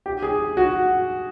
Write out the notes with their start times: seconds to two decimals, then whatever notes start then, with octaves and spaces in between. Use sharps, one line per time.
0.06 G4
0.22 G#4
0.57 F#4